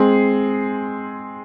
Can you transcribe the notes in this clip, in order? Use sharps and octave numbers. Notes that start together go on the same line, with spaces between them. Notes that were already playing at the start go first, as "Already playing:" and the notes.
Already playing: G#3 C4 G#4